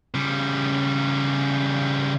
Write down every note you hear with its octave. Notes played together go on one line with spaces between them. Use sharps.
C#3 G3